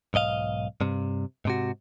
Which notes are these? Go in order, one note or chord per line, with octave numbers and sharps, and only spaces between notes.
B1 G#2 D#5 F5
G2 C3
G#2 C3 F#4